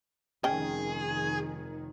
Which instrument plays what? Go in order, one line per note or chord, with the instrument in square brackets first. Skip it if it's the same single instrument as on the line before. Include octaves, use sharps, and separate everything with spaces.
[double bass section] F1 D#3 [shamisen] C#4 G5 [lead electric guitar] G#4